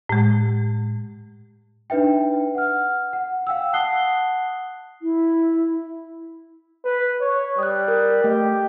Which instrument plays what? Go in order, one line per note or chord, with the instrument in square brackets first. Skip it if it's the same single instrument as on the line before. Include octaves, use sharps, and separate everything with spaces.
[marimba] A2 G#3
[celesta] D4 D#4 B4 E5 G5
F#5 F6
F#5
F5 G5 E6
F#5 A5 D#6 F#6 C7 G7
[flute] E4
[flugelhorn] B4
C#5
[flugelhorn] G3 [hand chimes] D#6 F#6
[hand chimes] A#4
[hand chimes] A3 D#5 [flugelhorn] G4